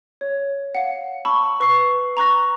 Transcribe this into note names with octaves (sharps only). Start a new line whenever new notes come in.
C#5
F5 F#5
A5 B5 C#6 E6
B4 C#6 E6 C7
A#5 C#6 F#6 A#6